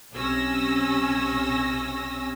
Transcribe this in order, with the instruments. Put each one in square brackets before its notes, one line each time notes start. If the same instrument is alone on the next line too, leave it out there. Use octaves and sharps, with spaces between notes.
[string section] B1 C3 C#4 G#5 E6 A#6